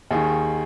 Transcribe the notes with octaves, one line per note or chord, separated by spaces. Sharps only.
D#2 D#3 G#4